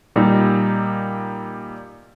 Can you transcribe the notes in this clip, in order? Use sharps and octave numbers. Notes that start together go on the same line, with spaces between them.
A#2 G3 D#4